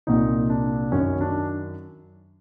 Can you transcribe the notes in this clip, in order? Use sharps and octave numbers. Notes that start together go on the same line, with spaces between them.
C2 A#2 D#4
D4
F#2 D#3 C#4
D4